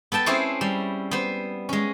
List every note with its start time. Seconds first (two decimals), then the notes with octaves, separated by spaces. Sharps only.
0.12 B3 A4 G5 A5
0.26 C4 C#4 E4 G#4 C5
0.61 G3
1.11 B3 C5
1.69 G#3 C#4